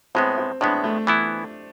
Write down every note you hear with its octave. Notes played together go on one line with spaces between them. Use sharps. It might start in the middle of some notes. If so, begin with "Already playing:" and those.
A2 G#3 B3 C4
C4
A2 G#3 B3 D4
A3
E3 B3 E4